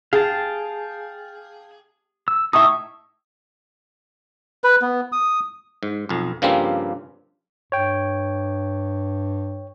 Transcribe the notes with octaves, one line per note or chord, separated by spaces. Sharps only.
G#4 F5 G5 A5
E6
A2 D#4 E5 C#6 D#6
B4
B3
D#6
G#2
B1 F2
G2 C#3 F3 G3 A#3 C4
G2 C#5 G5